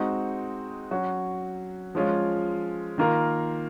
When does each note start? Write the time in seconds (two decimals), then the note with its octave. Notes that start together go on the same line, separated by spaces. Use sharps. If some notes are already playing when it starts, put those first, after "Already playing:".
Already playing: G#3 C4 D#4 F#4
0.91 F#3 C#4 F#4
1.95 F3 G#3 C#4 F4
2.98 D#3 A#3 F4 A#4